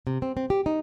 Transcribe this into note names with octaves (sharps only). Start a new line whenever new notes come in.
C3
C4
C4
G4
D#4